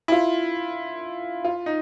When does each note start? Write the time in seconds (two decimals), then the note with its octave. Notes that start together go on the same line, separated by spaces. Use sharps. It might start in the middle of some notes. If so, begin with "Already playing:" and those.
0.08 E4
0.12 F4
1.44 F4
1.66 D#4